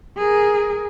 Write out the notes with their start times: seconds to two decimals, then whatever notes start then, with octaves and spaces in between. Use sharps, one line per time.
0.17 G#4 A#4